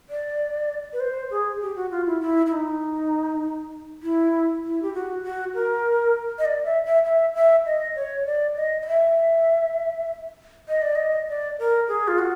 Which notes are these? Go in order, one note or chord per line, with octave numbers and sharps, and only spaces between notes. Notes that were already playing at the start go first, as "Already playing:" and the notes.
D5
B4
C5
G#4
G4
F#4
F4
E4
E4
E4
D#4
E4
E4
G4
F#4
F#4
A#4
D#5
D5
E5
E5
E5
E5
D#5
C#5
D5
D#5
D#5
E5
D#5
D5
D#5
D5
A#4
G#4
F4
F#4